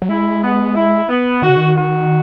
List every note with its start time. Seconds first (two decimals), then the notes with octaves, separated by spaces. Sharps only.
0.02 F#3
0.09 G#3 E4
0.42 B3
0.75 E4
1.09 B3
1.42 D#3 F#4
1.49 C#3
1.57 D#3
1.75 F#4